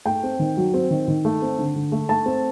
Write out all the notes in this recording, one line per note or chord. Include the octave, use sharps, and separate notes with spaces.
A3 G5
C4
D#3
F#3
C4
D#3
D#3
A3
C4
D3
D3
A3
A3 A5
C4